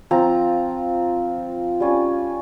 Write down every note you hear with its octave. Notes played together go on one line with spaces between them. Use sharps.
F3 C4 F4 A#5
G3 C#4 F4